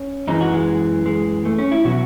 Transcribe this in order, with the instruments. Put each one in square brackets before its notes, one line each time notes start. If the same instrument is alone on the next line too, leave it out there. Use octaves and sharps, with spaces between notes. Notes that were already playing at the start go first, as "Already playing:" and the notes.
Already playing: [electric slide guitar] C#4
F#2 E3 G#3 D#4
F#4
G#3
G#3
A3
C#4
E4
B2 F#3 F#4